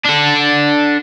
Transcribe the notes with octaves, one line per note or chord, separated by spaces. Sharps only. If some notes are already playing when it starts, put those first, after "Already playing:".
D4 A4